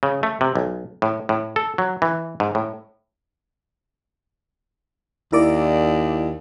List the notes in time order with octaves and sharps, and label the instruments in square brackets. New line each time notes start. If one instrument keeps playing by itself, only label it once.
[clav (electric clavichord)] C#3
A3
C3
B1
A2
A2
A4
F#3
E3
G#2
A2
[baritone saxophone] D#2 [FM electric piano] E4 A#4 D5